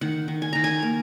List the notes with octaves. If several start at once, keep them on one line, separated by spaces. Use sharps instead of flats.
D#3 F#5
D#3
G#5
D#3 A#5
G#5
A#3